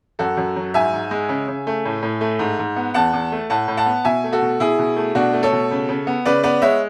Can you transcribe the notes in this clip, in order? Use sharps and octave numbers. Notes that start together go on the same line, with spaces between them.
F#2 F#4 A4
F#2
F#3
G#2 E5 G#5
G#2
G#3
C#3
C#3
A3
A2
A2
A3
G#2
G#2
B3
E2 F#5 A5
E2
A3
A2 F#5 A5
A2
F#5 A5
B3
B2 E5 G#5
A3
F#4 A4
B2
B2 E4 G#4
B2
A3
B2 D4 F#4
A3
A4 C#5
B2
C#3
C#3
B3
C#3 B4 D5
B3 B4 D5
G#3 C#5 E5